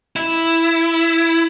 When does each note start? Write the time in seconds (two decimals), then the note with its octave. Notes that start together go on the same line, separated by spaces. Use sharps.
0.16 E4